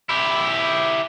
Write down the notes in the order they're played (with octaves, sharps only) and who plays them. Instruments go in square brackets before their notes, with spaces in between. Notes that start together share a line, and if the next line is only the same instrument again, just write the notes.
[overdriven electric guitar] E4 G4